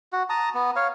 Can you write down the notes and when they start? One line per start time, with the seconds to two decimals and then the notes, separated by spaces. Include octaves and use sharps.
0.13 F#4
0.30 A5 A#5 D#6
0.54 B3
0.76 C#5 F5